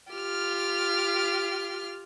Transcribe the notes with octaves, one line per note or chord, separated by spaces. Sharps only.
F4 G4 F6